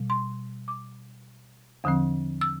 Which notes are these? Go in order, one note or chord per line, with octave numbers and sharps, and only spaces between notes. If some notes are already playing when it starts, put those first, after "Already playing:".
Already playing: B2 G3
C6
D6
E2 D3 F3 C4
E6